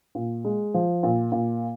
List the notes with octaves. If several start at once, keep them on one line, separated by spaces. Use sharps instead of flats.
A#2
G#3
F3
A#2
A#2